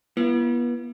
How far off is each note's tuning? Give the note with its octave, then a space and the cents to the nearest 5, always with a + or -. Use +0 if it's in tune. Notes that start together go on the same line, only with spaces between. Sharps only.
B3 -35 E4 +45